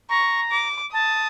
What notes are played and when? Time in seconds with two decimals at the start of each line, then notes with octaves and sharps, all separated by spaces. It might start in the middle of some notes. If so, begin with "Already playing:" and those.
0.09 A#5 C#6
0.51 D6
0.93 A5 D#6